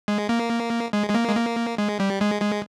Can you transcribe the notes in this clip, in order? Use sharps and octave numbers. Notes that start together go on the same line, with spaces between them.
G#3
A#3
G#3
G#3
A#3
G#3
A#3
G#3
G3
G#3
G#3